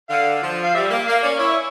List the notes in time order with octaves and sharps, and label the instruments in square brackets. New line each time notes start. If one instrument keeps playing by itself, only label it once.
[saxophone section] D3 [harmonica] F5
[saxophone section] F3
[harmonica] F5
[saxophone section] G3 [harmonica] E5
[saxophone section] A#3
[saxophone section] A#3 [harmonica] F5
[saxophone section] C#4 [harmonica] D5
[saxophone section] E4 [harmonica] C#5